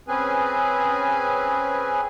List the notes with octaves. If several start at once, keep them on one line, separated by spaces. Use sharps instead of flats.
C4 C#4 G#4 B4 G#5